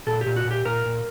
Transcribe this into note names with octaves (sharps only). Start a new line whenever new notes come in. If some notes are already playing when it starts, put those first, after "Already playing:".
A#2 A4
G4
A#2
F#4
A#2
G4
A#2 A#4
A#2